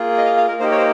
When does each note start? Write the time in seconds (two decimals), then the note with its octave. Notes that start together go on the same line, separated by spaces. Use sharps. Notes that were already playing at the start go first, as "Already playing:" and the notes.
Already playing: A#3 F4 G#4
0.18 D#5
0.25 F5
0.37 F5
0.48 A#4
0.60 A#3 D#4 G4 C5
0.71 C#5
0.77 C5